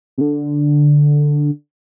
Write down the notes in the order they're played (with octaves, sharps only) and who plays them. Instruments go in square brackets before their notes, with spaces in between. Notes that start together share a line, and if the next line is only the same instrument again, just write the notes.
[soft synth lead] C3
D3